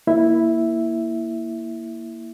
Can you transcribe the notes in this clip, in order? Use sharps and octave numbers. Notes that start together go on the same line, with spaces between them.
A#3 E4 E5